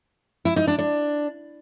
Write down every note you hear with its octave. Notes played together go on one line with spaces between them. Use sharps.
E4
D#4
D4
D4